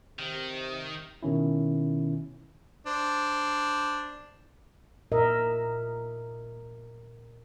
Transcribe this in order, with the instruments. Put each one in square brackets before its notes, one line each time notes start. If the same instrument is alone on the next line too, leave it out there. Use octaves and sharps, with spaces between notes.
[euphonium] C3 [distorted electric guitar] D#3
[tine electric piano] B2 D#3 C#4 E4
[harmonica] D4 C5
[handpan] A#2 A#4 D#5 E5